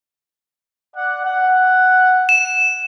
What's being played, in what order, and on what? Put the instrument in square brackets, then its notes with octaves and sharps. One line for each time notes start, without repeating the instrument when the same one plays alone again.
[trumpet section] D5 F#5
F#5
[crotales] E7